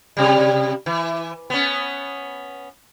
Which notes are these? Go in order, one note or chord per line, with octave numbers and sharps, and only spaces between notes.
C3 G3
E3
B3 C#4